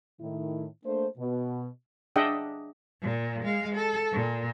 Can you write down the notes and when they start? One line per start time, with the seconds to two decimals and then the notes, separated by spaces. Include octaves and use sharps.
0.21 A2 D#3 E4
0.85 A3 A#3 D4 C5
1.18 B2
2.16 D4 G#4 D#5 E5 F#5 G5
3.02 A#2
3.43 G#3 F5
3.75 A4
4.12 A#2